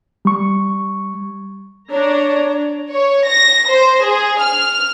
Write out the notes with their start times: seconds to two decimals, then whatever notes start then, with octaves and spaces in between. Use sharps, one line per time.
0.25 G3 C#6
1.91 D4 C#5 A#5
2.92 C#5
3.27 A#6
3.70 C5
4.05 G#4
4.42 F6